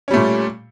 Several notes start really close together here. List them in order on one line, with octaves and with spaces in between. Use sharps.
C#4 G3 A3 A#2